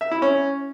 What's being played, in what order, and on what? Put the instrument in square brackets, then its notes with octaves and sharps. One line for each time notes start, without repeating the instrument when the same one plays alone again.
[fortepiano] E5
E4
C#4